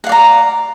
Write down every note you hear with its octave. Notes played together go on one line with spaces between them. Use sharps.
D5 F5 F#5 A#5